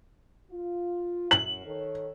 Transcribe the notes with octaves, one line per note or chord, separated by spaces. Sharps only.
F4
F#2 F#7
D#3 A4 C#5